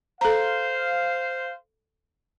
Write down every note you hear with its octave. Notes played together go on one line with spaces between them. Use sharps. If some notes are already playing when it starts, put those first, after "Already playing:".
A4 C5 F5 A#5